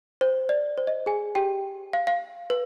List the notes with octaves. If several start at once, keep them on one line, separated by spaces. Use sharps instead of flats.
C5
D5
C5
D#5
G#4 G#5
G4 G5
F5
F5
B4